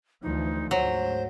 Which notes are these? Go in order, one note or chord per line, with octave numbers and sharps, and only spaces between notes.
D2 E3 F3 D#4
D2 G#2 F#3 C5